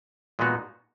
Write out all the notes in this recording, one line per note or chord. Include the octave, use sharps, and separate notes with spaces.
A#2 G#3 B3 D#4 F#4